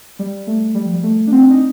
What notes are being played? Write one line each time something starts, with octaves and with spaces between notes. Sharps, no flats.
G3
A3
G3
F3
G3
A3
D4
C4
D4
D#4